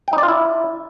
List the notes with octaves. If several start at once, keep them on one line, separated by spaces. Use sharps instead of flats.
G5
D#4
D5
F4
E4